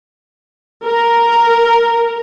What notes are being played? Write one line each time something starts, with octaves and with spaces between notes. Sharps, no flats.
A#4